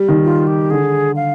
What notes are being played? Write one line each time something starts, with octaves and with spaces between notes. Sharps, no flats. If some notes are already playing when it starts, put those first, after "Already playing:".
Already playing: G3
D#3
F4
G4
D3 G#4
F5